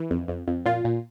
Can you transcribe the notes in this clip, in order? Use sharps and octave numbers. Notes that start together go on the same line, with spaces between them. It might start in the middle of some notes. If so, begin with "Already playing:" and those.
Already playing: E3
F2
F2
F2
A#2 F4
A#2